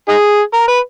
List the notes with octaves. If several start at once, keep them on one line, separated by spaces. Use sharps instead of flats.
D#4 G#4
A#4
B4